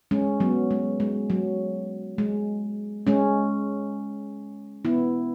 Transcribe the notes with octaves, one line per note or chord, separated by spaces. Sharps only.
G#3 C#4
F#3 B3
G#3
G#3
F#3
G#3
G#3 C#4
B3 E4